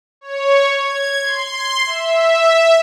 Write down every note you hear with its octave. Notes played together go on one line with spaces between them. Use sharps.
C#5
G#6
C6
E5